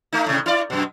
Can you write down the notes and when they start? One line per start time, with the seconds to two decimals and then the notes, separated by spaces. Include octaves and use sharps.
0.13 A3 D#4
0.27 A2 C3
0.46 E4 D5
0.70 F#2 B2